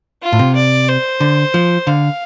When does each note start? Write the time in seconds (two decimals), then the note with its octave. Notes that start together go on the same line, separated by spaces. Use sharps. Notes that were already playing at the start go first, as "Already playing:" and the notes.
0.22 F4
0.32 A2
0.39 C3
0.56 D5
0.88 C5
1.20 D3
1.54 F3
1.87 D3 F5